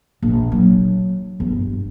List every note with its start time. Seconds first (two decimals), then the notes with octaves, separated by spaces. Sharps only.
0.22 A#1
0.52 F#3
1.40 G1